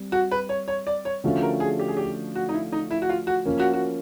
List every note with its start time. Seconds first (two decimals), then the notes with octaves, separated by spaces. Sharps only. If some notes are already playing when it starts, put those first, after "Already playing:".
Already playing: G3 C4
0.12 F#4
0.31 B4
0.49 C#5
0.68 C#5
0.87 D5
1.05 C#5
1.24 D3 F3 A3 C#4 F#4
1.42 A#4
1.60 G#4
1.79 G4
1.88 G#4
1.97 G4
2.35 F#4
2.49 D#4
2.54 E4
2.72 D#4
2.91 E4
3.02 F#4
3.09 F4
3.27 F#4
3.45 F3 A#3 C#4
3.60 F#4
3.73 F#4